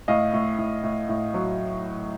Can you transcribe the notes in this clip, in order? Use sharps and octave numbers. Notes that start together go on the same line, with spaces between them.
A2 D#5 F5
A2
A2
A2
A2
F#3